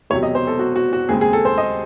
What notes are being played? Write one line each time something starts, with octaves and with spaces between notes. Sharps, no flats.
E1 E2 C3 F#3 C#5
D#5
C5
A4
F#4
F#4
F#4
D#2 C#3 G#3 C4 G#4
G#4
A4
C5
D#5